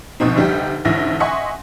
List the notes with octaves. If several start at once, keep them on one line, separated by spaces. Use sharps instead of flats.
D2 B2 F3 C4 D#4
F1 D2 G3 D#4 G4
A1 D2 G#2 E4 A#6
D#5 E5 F#5 G#5 C6 C#6